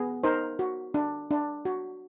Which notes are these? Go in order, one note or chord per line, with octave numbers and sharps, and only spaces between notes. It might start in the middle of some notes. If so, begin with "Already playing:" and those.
Already playing: B3 G#4
D#4 A#4 C5
F#4
D4
D4
F#4